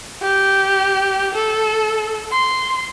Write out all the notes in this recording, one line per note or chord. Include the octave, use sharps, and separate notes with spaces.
G4
A4
C6